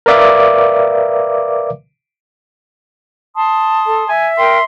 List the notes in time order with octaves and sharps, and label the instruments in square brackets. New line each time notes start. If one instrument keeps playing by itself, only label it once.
[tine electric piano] A#4 B4 D5 E5 F5 D6
[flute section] A5 C6 D#6
[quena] A4
[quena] E5 [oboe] G#5
[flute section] A#4 G5 [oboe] C6